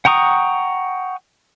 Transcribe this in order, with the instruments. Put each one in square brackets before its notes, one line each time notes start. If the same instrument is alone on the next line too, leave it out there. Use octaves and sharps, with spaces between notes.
[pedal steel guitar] F#5 G5 A#5 C#6 D#6